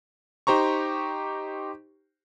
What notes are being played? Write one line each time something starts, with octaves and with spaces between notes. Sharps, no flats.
D#4 G4 C5 A#5 C#6